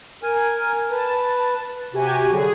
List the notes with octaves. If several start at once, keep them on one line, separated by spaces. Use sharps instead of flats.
A#4 G#5
B4 A5
C3 F#4 G4 G#5
D3 F#3 G#4